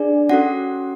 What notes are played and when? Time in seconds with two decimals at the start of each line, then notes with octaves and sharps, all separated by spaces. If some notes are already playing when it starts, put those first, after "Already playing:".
Already playing: D4 G#4 D5
0.29 C#4 F#4 A4 F#5